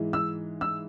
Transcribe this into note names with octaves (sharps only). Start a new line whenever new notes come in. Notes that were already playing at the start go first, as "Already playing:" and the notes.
Already playing: G#2 E3 G#3
E6
E6